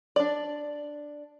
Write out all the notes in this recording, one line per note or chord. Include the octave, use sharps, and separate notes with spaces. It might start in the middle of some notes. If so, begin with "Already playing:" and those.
D4 D5